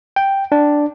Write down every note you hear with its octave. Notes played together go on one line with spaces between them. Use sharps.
G5
D4